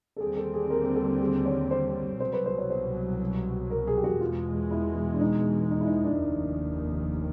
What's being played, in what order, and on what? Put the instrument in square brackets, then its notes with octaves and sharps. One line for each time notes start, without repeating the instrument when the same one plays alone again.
[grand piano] A4
[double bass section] D#2 D3 G3 C4 [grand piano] G#4
[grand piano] A4
G#4
A#4
A#4
A4
G#4
C#5
C5
[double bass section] C2 B2 F#3 [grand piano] C5
[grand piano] B4
C5
C#5
C5
A#4
G#4
G4
F#4
[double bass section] E2 B2 G#3 [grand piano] F4
[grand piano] E4
D4
D#4
D#4
E4
D#4
D4
[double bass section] F1 D#2 D#3